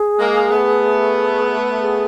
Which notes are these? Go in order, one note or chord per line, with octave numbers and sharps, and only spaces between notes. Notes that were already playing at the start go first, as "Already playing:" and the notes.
Already playing: G#4
G#3 A#3
A3 B3
G#4